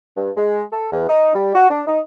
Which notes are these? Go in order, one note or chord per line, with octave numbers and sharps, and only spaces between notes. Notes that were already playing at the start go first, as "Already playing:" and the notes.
G2
G#3
A4
E2
D#4
G3
F#4
D4
D#4